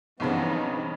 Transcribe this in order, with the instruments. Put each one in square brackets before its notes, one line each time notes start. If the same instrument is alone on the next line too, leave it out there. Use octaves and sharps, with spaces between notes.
[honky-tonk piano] B1 G2 C#3 [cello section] E3 C4 D#4 [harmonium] F3 B3